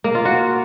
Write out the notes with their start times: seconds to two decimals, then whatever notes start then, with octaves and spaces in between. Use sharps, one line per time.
0.04 A#3
0.15 F4
0.25 F#4